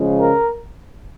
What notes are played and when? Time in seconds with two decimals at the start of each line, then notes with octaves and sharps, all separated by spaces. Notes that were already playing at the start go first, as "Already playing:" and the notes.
Already playing: C#3 F3 G#3
0.19 A#4